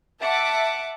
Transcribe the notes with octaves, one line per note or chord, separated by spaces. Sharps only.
E5 F#5 A5 D6